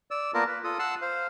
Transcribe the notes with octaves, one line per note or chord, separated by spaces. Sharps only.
D5 E6
A#3 B3 F4 A#4 D5 A5
B4
F4 A4 D#6
F#5 A5 C6 E6
C5 F5